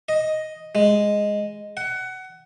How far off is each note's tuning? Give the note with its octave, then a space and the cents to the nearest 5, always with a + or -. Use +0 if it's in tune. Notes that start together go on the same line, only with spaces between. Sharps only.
D#5 +5
G#3 -5
F#5 +20